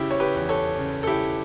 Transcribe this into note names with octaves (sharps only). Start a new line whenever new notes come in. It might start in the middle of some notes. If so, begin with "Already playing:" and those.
Already playing: C#3 E4 G4
C#5
G4 B4
E2
A4 C#5
C#3
A4
E4 G4